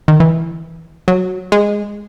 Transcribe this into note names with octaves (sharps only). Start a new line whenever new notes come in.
D#3
E3
F#3
G#3